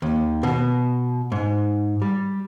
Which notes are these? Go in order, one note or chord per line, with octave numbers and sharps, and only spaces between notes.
D#2
B2
G#2
G3